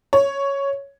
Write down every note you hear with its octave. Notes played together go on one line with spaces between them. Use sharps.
C#5